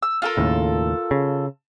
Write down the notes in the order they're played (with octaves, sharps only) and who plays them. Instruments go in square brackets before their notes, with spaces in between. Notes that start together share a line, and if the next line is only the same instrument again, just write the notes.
[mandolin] E6
F4 A4 A#4
[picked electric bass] D#2 A2 C#3
C#3